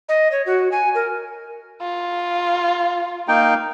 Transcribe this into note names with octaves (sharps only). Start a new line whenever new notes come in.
D#5
C#5
F#4
G#5
A#4
F4
A#3 D#4 G5